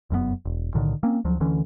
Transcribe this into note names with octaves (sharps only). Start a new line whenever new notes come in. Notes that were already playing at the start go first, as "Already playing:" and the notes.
F1 F#2 B2 B3
E1
B1 A2 D3 D#3
A#3 C4 C#4
D2 F3 F#3
D2 D3 E3 C#4